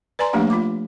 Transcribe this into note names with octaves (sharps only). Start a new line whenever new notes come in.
B4 D5 G#5 A#5 C6
F3 A3 A#3 D4 G4 F#5
F4 D6